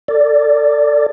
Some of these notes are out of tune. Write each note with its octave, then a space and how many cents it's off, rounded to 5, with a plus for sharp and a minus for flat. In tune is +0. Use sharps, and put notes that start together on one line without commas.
A4 +30 D5 +0